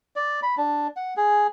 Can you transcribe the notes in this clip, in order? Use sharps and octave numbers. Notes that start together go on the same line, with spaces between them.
D5
B5
D4
F#5
G#4